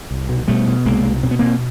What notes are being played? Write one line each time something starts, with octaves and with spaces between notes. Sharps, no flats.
C2
B2
B2 G3 A3
B2
C2 G#3 A#3
B2
B2 C4
B3
B2 A#3 C4